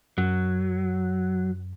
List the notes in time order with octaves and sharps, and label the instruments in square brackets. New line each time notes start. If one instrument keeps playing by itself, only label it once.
[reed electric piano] F#2 [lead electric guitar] F#3